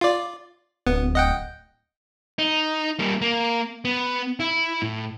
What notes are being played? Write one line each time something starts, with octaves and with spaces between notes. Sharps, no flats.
F4 D5
D1 B3
D#5 F#5 G5
D#4
G3 A#3
A#3
B3
E4
A2